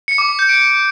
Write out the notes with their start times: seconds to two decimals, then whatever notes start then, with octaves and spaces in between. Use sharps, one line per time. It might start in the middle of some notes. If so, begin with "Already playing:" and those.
0.08 C#7
0.18 D6
0.29 D6
0.39 G6
0.49 D7